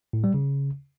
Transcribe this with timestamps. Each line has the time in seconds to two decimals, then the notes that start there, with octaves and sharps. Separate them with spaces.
0.13 A2
0.24 G3
0.34 C#3